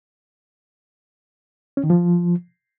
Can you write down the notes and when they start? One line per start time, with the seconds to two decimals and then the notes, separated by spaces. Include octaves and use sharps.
1.77 C#4
1.84 D#3
1.90 F3